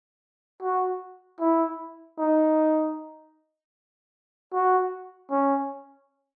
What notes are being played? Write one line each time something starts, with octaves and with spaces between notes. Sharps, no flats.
F#4
E4
D#4
F#4
C#4